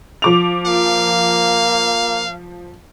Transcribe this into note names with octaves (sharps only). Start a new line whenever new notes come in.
F3 D6 F7
A#3 F5